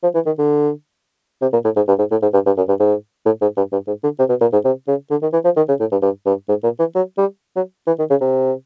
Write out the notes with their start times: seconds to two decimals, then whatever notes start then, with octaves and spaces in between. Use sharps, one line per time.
0.03 F3
0.15 E3
0.26 D#3
0.38 D3
1.42 C3
1.53 A#2
1.64 A2
1.76 G#2
1.88 G2
1.99 G#2
2.11 A2
2.22 G#2
2.34 G2
2.46 G2
2.57 F#2
2.68 G2
2.80 G#2
3.26 A2
3.41 G#2
3.57 G2
3.72 G2
3.87 G#2
4.04 D3
4.19 C3
4.29 B2
4.41 A#2
4.53 G#2
4.64 C3
4.88 C#3
5.11 D3
5.22 D#3
5.33 E3
5.45 F3
5.57 D#3
5.69 C#3
5.80 A2
5.92 G2
6.02 G2
6.26 G2
6.49 G#2
6.64 A#2
6.79 E3
6.95 F#3
7.18 G3
7.56 F#3
7.87 E3
7.99 D#3
8.10 C#3
8.21 C3